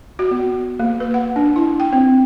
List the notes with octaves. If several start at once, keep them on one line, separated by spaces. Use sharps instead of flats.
F#4
B3
A#3
B4
F#5
D4
E4
G5
C4